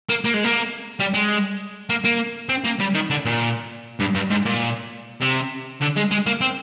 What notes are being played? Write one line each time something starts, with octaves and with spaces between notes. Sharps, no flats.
A#3
A#3
G#3
A#3
G3
G#3
A#3
A#3
C4
A#3
G3
D#3
D3
A#2
G2
G2
G#2
A#2
C3
D3
G#3
G#3
A#3
C4